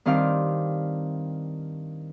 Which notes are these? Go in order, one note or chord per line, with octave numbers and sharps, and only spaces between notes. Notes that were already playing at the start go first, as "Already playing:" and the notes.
G2 D#3 C4 D#4 F5 D6